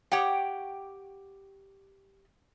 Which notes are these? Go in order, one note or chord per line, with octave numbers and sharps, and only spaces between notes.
G4 C#5 F#5 G5